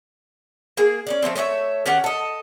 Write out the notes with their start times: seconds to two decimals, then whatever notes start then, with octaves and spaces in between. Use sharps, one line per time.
0.77 A#3 G#4
1.07 C#4 D#4 D5
1.23 F3 A3 A#3 C4
1.36 A3 C#5 D#5 E5
1.86 D#3 C#4 G4 F#5
2.04 A4 D#5